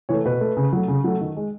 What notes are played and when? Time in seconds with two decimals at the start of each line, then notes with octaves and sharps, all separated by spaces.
0.09 E3 A3 C#5
0.25 B2 B4
0.41 A3
0.57 C#3
0.73 F#3 A3
0.88 C#3
1.04 F#3 A3
1.21 D#3
1.37 G#3